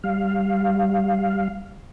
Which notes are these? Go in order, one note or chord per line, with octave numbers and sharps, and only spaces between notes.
G3 F5